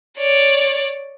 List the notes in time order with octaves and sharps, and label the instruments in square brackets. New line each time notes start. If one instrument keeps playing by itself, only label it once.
[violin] C#5 D5